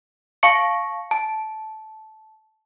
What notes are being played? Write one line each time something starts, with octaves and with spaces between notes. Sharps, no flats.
F5 A5 C#6 C#7
A5